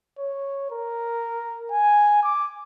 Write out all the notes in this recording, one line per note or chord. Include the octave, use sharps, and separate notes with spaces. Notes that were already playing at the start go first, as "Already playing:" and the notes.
C#5
A#4
G#5
D6